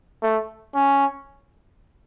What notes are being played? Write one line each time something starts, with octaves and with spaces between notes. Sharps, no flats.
A3
C#4